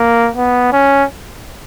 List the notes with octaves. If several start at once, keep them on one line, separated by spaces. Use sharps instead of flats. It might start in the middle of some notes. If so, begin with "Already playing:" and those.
Already playing: A#3
B3
C#4